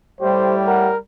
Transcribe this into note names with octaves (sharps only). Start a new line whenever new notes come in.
A2 G3 G4 C5
A#4 F#5